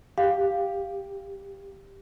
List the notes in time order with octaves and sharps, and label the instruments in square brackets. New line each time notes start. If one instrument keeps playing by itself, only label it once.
[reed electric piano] G4 [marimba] F5